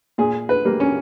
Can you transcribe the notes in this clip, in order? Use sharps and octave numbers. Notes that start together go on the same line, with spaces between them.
A#2 G#4
B4
G3 A#3
C#4